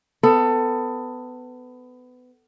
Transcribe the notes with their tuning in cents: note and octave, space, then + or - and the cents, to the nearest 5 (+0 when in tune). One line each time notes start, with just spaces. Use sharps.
B3 +25 A4 +20